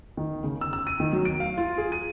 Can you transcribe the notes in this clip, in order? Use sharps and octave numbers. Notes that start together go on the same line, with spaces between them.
D#3
C#3
E6
E6
D#7
D#3
F#3
D7
F5
F4
G#4
D#7